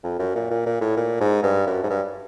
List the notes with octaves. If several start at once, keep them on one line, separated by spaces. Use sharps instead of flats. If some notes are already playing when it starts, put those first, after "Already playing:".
F2
F#2
A#2
A#2
A#2
A2
A#2
G#2
G2
F#2
G#2
G2